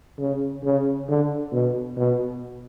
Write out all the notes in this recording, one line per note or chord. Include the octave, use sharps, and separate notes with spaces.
C#3
C#3
D3
B2
B2